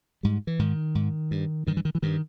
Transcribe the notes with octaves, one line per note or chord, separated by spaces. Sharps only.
G#2 G3
E3
G#2 D#3
G#2
G2
G2 D#3
E3
D#3
E3
G2 D#3